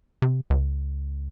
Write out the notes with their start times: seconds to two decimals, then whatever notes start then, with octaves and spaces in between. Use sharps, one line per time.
0.22 C3
0.50 C#2